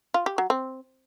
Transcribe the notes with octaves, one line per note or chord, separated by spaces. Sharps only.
F4
G4
F#3
C4